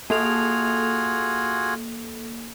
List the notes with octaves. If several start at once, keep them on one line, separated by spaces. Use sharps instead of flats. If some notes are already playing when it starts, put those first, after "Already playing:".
A#3 F4 F#4 G#4 A4 F7